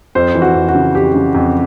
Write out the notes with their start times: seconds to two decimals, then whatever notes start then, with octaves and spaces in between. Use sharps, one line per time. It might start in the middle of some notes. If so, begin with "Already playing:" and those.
0.15 F2 C5
0.35 E3
0.42 F#4
0.55 F2
0.68 F#4
0.75 C#3
0.95 F2 G4
1.14 C#3
1.35 F2